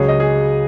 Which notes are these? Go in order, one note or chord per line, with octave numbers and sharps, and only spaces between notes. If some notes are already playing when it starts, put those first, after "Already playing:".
Already playing: C#2 C#3 F#3 G#4 C#5
D#5
G#4